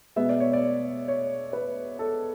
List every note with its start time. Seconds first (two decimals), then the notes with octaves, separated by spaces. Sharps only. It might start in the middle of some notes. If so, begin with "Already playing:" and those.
0.16 B2 G#3 B3 E5
0.29 D5
0.40 C#5
0.53 D5
1.08 C#5
1.53 B4
1.99 A4